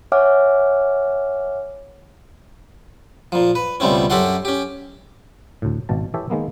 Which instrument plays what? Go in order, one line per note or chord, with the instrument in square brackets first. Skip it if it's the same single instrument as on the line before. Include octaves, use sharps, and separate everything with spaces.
[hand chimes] C#5 E5 F#5 G#5 D6 F6
[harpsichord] A#2 F3
B4
C#2 B2 G3 A3 C4 C#4
F#2 C#4 G4 A4 F#5 C6
C#4 G4
[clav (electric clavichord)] D2 A2
G#1 B2 A5
E3 G4 A4 C#5 E5
D#3 G#3 A#3 B3